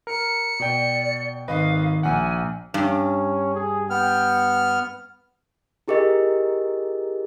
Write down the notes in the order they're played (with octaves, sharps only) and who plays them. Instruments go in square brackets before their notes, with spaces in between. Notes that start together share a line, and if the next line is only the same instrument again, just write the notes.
[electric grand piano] A#4 [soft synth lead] C#7
[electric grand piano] B2 G5 [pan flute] D5
[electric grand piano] G#1 B4 D#5 [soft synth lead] D#3 [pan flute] F5
[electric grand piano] A#1 F#5 [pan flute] G#5
[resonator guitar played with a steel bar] G2 [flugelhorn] C#4
[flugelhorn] G#4
[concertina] B3 F6 [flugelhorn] G5
[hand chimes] E4 G4 G#4 A#4 D#5